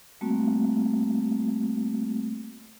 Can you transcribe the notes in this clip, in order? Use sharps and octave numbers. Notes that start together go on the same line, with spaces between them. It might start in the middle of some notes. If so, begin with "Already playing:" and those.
G3 A3 A#3 C4 F#4